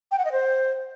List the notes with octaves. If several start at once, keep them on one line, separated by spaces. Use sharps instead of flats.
G5
F#5
D#5
C5